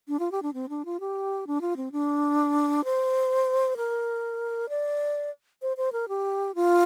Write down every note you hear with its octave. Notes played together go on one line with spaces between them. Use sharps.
D4
F4
G4
D4
C4
D4
F4
G4
D4
F4
C4
D4
C5
A#4
D5
C5
C5
A#4
G4
F4